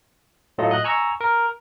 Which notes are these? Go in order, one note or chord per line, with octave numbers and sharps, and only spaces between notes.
A2 F#3 A3 F4 D#5
D#5 F#6
G#5 A#5 C#6 E6
A#4